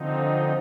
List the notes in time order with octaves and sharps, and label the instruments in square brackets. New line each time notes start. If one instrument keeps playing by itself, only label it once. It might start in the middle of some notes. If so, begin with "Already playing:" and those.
Already playing: [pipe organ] D3 F3 C4 D#4